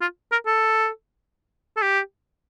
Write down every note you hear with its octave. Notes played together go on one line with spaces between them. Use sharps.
F4
A#4
A4
A4
G4